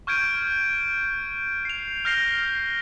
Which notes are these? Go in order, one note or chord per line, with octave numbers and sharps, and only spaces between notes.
C#6 F6 G6 G#6 D7 D#7
C7 F7
F6 G6 A#6 C7 F7 G7